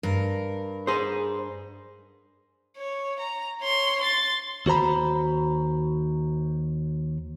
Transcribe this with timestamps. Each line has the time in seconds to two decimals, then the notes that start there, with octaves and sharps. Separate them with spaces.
0.03 G2 A#4
0.87 G#4 C5
2.77 C#5
3.20 A#5
3.61 C#5 C6
4.01 C6 A6
4.66 D#2 F#4 C5 A#5 B5